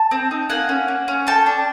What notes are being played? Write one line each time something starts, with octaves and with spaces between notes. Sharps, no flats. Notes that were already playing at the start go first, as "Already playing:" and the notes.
Already playing: A5
C4
D#4
A#3 F#5 G#5
C#4
A#3
C#4
A4 G5 A5
D4